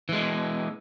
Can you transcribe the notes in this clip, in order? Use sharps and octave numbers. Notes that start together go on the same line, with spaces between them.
E3 G#3